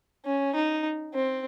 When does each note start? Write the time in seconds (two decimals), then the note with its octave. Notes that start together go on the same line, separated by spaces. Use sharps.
0.25 C#4
0.55 D#4
1.14 C4